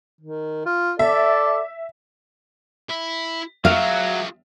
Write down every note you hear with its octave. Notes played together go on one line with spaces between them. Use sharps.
D#3
F4
A4 D5 E5
E4
F#3 F4 G#4 E5 F5